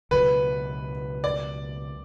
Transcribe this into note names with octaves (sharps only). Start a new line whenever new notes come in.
C#2 B2 F#3 B4
D5